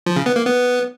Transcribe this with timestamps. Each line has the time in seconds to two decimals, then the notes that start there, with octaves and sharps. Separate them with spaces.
0.06 F3
0.16 C#3
0.26 B3
0.36 A#3
0.46 B3